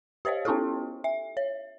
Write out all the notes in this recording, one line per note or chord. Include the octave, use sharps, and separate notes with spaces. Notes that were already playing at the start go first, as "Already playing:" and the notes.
G4 C5 C#5 D#5 F5
B3 C#4 E4 F4 G4 A4
E5
C#5